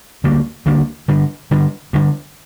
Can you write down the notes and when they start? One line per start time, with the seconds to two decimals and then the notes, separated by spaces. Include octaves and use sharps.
0.24 D2 D3 G3 A#3
0.66 D2 D3 G3 A#3
1.08 G2 D3 G3
1.51 G2 D3 G3
1.93 G2 D3 G3